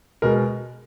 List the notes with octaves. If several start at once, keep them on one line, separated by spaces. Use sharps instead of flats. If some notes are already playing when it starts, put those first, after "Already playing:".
B2 G#3 A#4